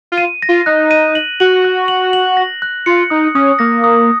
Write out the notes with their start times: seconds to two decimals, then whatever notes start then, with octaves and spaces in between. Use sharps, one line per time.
0.12 F4
0.18 D#7
0.42 A#6
0.49 F4
0.66 D#4 F#6
0.91 D#7
1.15 F#7
1.40 F#4 F#7
1.65 F#6
1.88 F#7
2.13 F#7
2.37 A#6
2.62 F#6
2.86 F4 C#7
3.10 D#4 D#6
3.35 C#4 D#6
3.59 A#3 A#6
3.84 D#6